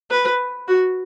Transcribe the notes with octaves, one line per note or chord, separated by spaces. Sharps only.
B4
F#4